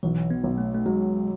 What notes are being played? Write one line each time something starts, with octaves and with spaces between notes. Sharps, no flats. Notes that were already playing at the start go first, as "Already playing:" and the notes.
B1 E3
B3
B1
A3
A3
F#3 G#3